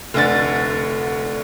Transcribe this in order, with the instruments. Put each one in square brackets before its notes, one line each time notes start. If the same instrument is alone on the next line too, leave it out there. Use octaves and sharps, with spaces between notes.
[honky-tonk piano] F1 D2 D3 A6